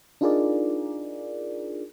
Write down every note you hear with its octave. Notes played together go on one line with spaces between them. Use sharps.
D4 D#4 F4 G#4 A#4 D5